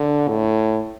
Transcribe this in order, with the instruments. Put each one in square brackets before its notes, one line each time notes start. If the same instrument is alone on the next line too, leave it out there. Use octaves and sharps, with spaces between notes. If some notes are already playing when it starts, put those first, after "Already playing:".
Already playing: [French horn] D3
A2